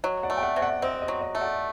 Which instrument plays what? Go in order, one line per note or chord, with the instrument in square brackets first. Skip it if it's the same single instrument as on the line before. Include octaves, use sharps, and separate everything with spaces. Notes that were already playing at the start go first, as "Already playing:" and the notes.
[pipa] F#3 [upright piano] D#5
[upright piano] D5 F#5
[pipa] A3
[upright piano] G5
D5 F#5
[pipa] C3
[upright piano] D5 F#5
[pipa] C4 [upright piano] D#5
[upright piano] D#5
[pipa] F#3
[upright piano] D#5
[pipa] A3
[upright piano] D5 F#5